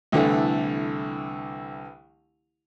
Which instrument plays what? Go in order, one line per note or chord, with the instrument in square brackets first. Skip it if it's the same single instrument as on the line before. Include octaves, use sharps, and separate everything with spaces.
[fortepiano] C2 D3 E3 A3